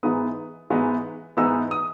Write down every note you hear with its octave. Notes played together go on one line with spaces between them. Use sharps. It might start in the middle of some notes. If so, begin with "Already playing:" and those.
G#2 E3 G#3 B3 D#4 D#6
G#2 E3 G#3 B3 D#4
G#2 E3 G#3 B3 D#4 E6
D#6